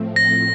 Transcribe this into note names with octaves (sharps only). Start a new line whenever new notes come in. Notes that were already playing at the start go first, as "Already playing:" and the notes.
Already playing: A2 F3 A3 C4
A#6